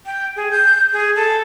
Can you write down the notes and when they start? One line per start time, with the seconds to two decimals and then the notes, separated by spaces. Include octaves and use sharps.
0.06 G5
0.36 G#4
0.51 G6
0.93 G#4
1.16 A4